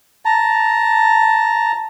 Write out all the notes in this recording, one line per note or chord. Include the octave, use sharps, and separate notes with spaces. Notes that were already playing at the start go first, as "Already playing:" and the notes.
A5 A#5